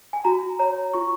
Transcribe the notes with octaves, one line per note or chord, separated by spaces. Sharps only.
G#5
F#4 A#5
C#5 A#5
F4 C#6